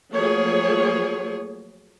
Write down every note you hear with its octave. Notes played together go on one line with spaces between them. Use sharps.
F3 F#3 A3 A#3 G#4 C#5